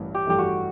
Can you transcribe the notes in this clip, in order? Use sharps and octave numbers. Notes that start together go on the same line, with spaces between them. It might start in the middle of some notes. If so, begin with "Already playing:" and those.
Already playing: A1 G2 E3 A3
G4
G2 E3 A3 G4
F#4